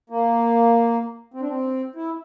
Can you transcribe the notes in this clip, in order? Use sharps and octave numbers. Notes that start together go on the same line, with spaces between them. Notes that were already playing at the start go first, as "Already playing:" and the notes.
A#3
C4
D4
C4
E4